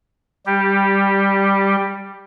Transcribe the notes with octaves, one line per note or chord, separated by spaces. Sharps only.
G3 G4